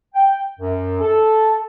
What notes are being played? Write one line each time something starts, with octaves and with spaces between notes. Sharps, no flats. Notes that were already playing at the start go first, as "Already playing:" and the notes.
G5
F#2
A4